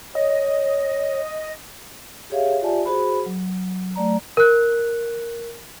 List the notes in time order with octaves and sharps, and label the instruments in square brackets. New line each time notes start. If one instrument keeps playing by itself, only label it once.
[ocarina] C#5 [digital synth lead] D#5
[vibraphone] G4 G#4 C#5 E5 F5
F4 G4 D5 E5 G#5 A5
F#4 G#4 C5 B5
F#3
F#3 A3 D5 A#5
[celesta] A#4 F#6